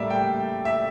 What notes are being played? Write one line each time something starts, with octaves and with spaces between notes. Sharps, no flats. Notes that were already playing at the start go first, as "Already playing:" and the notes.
Already playing: A2 G3 A#3 D5 E5
G5
E5